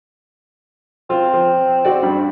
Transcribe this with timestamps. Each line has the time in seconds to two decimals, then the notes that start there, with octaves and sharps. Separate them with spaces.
1.10 C4 F4
1.34 F3
1.85 F#4 D5
2.03 G2